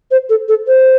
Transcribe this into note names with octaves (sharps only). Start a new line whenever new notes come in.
C5
A4
A4
C5